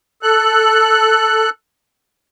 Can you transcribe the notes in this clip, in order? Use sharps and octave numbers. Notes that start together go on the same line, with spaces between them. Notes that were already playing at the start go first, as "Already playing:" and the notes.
A4 F#6